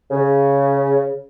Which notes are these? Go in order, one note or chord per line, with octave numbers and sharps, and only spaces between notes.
C#3